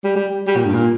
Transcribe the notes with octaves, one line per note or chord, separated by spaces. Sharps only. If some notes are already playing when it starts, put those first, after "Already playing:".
G3
G3
G3
A#2
G2
A#2